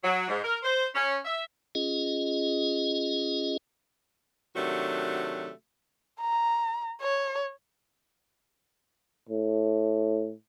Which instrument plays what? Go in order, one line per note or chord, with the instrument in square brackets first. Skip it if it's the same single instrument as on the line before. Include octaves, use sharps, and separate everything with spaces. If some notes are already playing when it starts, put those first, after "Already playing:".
[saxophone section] F#3
G#2
A#4
C5
C#4
E5
[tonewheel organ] C#4 F4 G#4 D#5
[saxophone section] C3 D#3 F#3 A3 D4 F#4
[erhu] A#5
C#5
[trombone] A2